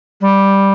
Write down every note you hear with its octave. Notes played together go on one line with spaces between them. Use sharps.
G3